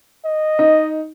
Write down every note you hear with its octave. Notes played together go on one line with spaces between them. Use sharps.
D#5
D#4